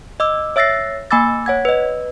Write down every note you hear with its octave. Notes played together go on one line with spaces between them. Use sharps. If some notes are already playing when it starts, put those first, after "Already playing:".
D#5 D6 E6
C#5 E5 E6 A6 A#6 C7
A#3 G#5 B5 D6 E6 A6
C#5 F#5 G#6
B4 D#5